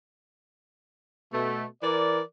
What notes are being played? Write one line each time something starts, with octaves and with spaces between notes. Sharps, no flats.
B2 A3
E3 A#4 D5